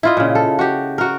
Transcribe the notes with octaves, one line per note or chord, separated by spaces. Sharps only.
E4 F4 D#5
A#2 C#3
A4
F#4 G4
F#4 A#4